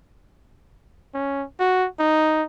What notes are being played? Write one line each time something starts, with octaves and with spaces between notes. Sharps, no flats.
C#4
F#4
D#4